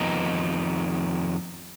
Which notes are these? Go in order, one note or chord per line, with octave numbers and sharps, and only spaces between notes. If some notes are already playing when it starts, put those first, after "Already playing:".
Already playing: F2 D#3 B3 D#4